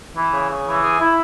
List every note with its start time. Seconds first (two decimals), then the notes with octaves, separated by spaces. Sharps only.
0.16 E3
0.33 C#3
0.50 C#3
0.66 E3
0.83 G#4
1.00 E4